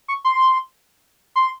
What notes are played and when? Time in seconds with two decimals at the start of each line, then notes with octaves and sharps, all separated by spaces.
0.08 C#6
0.25 C6
1.36 C6